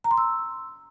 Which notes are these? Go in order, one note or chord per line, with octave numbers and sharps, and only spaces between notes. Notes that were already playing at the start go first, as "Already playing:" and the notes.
A#5
C6
E6